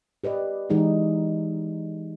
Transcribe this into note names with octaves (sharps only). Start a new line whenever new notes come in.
G4 B4 D5 D#5
E3 G#3 D#4 G4 G#4